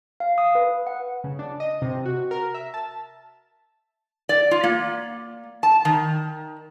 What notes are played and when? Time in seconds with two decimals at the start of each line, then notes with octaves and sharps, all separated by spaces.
0.20 F5
0.38 D#6
0.55 B4
0.87 F#5
1.24 C#3
1.39 D4
1.60 D#5
1.82 C3
2.06 F#4
2.31 A#4
2.54 E5
2.74 A5
4.29 D5
4.51 F4
4.64 A#3
5.63 A5
5.85 D#3